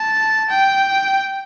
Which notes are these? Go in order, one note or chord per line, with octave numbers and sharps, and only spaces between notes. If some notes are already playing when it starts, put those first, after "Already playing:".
Already playing: A5
G5